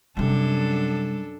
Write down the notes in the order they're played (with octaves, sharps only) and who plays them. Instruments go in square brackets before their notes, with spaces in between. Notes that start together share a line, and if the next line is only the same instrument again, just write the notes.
[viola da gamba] F#2 D4 A4 [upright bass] C3 G3